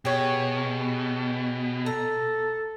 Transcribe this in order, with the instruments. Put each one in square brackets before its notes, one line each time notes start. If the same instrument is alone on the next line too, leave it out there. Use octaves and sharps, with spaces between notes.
[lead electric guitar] B2 [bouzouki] G4 G#4 C#5
[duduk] A4 [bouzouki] A#5